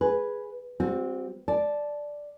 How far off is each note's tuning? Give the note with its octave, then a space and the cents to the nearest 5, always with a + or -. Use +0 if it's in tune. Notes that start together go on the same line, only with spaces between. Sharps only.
G#4 +0 B4 +0
G3 +25 C4 +0 F#4 -35
D5 +0 A5 -15